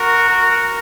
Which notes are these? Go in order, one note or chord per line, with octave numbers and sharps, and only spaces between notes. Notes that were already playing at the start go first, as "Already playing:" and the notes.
Already playing: F#4 A#4
A#4